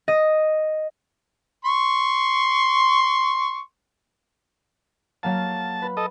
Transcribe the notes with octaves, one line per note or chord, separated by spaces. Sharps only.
D#5
C6 C#6
F#3 A#3 F5 A5
B4
A4 D#5